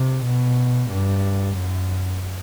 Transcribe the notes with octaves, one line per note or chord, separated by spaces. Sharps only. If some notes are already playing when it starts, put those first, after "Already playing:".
Already playing: C3
B2
G2
F#2